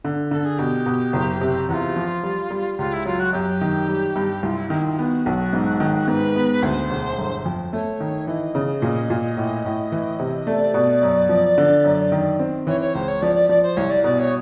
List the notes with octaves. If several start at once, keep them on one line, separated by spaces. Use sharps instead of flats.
D3
D3 A4
G#4
B2 G4
B2
F#1
C3
E2 F4 F#4
F3
G3
G3
C#2 F4
E4
F#3 F4
F#4
F#2 G4
D#3
G3
G2
C2 F4
E4
D#3 E4
F4
B3 F#4
B1
G#2
D#3
G#2 B4
B3
D2 C5 C#5
E1
G1
F2
A3 C#5
D#3
E3 D#5
C#3
A#2
A#2
A2
A2
E3
C3
A3 D5
B2
F#2
F3
D3
F#2
D#3
C4
E3 C#5
C#5
C#2 C5
C#5
F3 D5
D5
F3 D5
C5
C2 C#5
D5
B2 D5
C#5